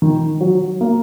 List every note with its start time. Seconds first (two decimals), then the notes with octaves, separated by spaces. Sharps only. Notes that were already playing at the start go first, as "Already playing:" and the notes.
0.02 D#3
0.40 F#3
0.81 A#3